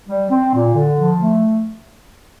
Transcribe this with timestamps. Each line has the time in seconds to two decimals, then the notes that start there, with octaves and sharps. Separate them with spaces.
0.08 G3
0.29 C4
0.53 A#2
0.74 D3
0.97 F3
1.20 A3